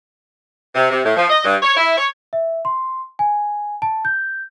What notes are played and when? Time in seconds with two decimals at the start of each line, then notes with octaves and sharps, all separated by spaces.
0.75 C3
0.91 C3
1.05 A2
1.16 F3
1.30 D#5
1.44 G2
1.62 C#5
1.77 E4
1.97 C#5
2.33 E5
2.65 C6
3.19 G#5
3.82 A5
4.05 G6